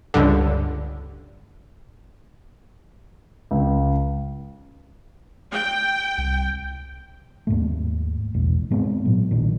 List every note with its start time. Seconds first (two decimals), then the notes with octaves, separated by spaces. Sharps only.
0.14 C#2 G2 D3
3.51 C#2
5.52 G5
6.18 C2
7.47 D#2 G#2 A3
8.34 A#1 E2 B2 G#3
8.71 G#2 G#3 B3 C4
9.05 A#2 F#3
9.31 A#1 A#2 D#3